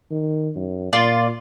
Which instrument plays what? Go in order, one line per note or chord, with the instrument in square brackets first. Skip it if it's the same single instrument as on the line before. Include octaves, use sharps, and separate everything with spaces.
[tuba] D#3
F#2
[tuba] A#2 [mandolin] F4 D5